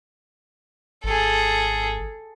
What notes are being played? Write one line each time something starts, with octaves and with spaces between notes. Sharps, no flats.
G#1 G#4 A4